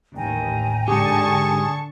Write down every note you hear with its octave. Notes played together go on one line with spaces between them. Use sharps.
A1 D#2 G5 G#5 A#5
G#2 D3 G4 G#4 A5 C#6